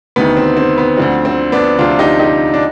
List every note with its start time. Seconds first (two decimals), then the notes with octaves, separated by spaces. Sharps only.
0.16 D2 C3 D#3 B3
0.37 C4
0.57 C4
0.78 B3
0.98 D2 D3 F3 C4
1.25 C4
1.52 B3 D4
1.79 D2 C3 F3 D4 F4
1.99 D#4 G4
2.20 D#4 G4
2.54 D4